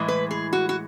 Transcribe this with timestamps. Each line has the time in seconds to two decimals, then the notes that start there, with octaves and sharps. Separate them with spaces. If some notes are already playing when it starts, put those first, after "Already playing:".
Already playing: A2 E3 G#3
0.08 B4
0.31 G#4
0.53 F#4
0.69 F#4